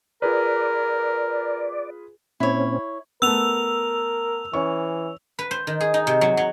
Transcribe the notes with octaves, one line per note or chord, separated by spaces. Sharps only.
F4 G#4 A#4 B4 D5
A#2 C4 C#4 E4 C#5
A3 B3 A#4 E6 F7
E3 C#4 C#6
B4
C5
D#3
G#4
D#4
C3
F#3
F#3